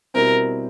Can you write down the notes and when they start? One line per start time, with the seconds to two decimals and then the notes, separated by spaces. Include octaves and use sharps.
0.14 B2 G3 C4 E4 A#4